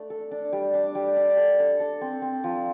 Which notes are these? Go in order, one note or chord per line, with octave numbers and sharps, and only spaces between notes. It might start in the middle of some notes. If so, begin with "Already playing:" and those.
Already playing: A3 D4
A4
D4
G3
D4
G3
D4
A4
A4
A4
C4
C4
F3